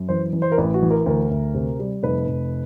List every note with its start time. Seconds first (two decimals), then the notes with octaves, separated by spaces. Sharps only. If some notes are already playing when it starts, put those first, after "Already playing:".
Already playing: F#2
0.08 E3 C5
0.33 E3
0.42 C5
0.52 A#4
0.58 A1 B4
0.74 F#4
0.82 E3
0.90 A#4
1.06 D2 A#4
1.30 D2
1.54 C3
1.79 G3
2.03 F1 B4
2.27 F1